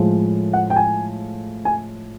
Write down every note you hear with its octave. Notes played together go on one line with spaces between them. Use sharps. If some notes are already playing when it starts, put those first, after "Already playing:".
Already playing: A2 F3 G#3
F#5
G5
G#5
G#5